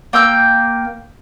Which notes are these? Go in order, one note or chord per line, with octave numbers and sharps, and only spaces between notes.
A#3 G5 E6 G6